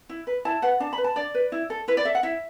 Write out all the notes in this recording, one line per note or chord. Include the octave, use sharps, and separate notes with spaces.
E4
B4
E4 A5
B4 F#5
D4 A5
B5
B4
A5
D4 D5
B4
E4
A4
E4 B4
D5
A4 E5
F#5
E4 E5